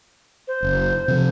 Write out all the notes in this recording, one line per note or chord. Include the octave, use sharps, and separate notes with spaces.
C5
F#1
C3 F3